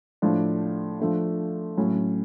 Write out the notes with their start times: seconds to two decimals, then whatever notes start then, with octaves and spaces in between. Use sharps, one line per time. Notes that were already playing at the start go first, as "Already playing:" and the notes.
0.22 A2 F3 A3 D4
0.99 F3 A3 D4
1.77 A2 F#3 C#4